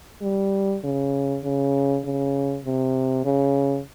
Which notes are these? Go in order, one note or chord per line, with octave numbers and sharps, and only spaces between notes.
G3
C#3
C#3
C#3
C3
C#3